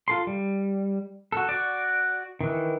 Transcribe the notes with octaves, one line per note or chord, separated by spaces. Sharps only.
F4 A4 C6
G3
F#4 A4
F#4 D5
D#3 E3